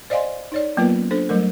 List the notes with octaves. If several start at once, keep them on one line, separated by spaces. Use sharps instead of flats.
C5 D5 D#5 F5 G#5 C6
D#4 C#5 D5
F#3 A#3 B3 F4 A#4 B4
C#4
D4 A4 C5
F#3 G3 A3 A#4